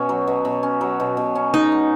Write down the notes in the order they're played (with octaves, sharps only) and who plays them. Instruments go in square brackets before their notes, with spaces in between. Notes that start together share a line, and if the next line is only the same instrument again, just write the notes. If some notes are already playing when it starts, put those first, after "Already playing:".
Already playing: [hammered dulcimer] B2 C#4
F#3
B2
B2
C#4
F#3
B2
B2
C#4
[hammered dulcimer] G#3 [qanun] D#4
[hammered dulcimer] F#4